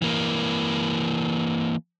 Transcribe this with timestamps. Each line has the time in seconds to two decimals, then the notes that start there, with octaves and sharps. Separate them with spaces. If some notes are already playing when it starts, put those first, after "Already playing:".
0.02 E3 A#3